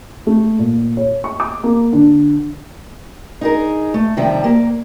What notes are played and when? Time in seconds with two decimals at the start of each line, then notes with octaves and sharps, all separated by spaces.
0.27 A3
0.59 A#2
0.97 C#5
1.24 C#6
1.40 D6
1.64 A#3
1.93 D3
3.41 D#4 G#4 A#4
3.94 A3
4.17 C3 D#3 F3 G3 E5
4.44 A#3